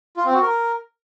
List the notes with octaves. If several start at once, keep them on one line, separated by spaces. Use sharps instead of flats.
F4
C4
F#4
A#4